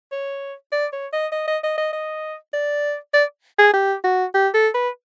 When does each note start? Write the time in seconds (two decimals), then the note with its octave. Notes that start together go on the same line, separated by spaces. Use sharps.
0.12 C#5
0.72 D5
0.93 C#5
1.13 D#5
1.32 D#5
1.48 D#5
1.63 D#5
1.78 D#5
1.93 D#5
2.53 D5
3.13 D5
3.59 G#4
3.73 G4
4.04 F#4
4.34 G4
4.54 A4
4.75 B4